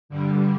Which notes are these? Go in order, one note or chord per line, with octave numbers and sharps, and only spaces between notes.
G2 D3 G3